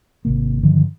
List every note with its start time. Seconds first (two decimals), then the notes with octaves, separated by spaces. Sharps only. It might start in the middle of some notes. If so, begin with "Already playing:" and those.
0.25 G#1 C3 A#3
0.63 G2 D3 D#3 F3